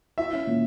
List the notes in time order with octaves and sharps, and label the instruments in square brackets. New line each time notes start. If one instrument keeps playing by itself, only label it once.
[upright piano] E4 [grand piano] E5
[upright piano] C#4
A#2